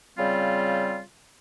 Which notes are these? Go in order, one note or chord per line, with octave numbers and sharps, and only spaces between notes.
C#3 G3 C4 F4